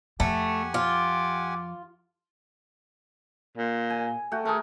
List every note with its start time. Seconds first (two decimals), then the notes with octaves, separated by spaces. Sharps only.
0.20 F2 F3 A3 G4 F#5 G#5
0.74 F4 D6
3.58 A#2
3.90 G#5
4.31 A3 F#4 G5
4.45 A3 G#4 A#4